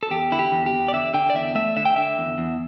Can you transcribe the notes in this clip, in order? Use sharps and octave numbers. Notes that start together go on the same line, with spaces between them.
A4
E2 G4
D3 E4
G4
E2
G4
E2
D5
D3 E5
D3 G5
D5
E2 E5
A3 E5
D3 E5
G5
D3 E5
E2
E2